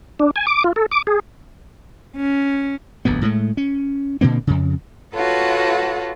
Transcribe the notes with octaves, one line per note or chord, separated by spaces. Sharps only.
D4
G#5
D6
F4
A4
D6
G#4
C#4
D1 A#1 F2 B3
A2 G#3 A3
C#4
A#2 D3 A#3 C4
F2 C#3
F4 F#4 A4 B4 C#5 F#5